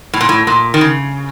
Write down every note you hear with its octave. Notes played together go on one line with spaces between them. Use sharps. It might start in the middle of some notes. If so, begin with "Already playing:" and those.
A2
A#2
A2
A#2
D#3
C#3